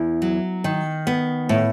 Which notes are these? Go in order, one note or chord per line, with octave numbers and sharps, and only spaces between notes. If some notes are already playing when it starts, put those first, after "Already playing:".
Already playing: E2 E4
F#3
D#3
B3
A2